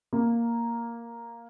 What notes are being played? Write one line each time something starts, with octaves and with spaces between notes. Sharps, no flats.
A#3